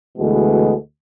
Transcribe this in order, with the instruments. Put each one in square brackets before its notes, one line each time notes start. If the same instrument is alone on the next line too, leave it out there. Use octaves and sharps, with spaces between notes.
[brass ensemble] D2 B2 E3 G#3